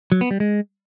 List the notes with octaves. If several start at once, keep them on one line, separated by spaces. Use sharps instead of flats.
F#3
B3
G3
G#3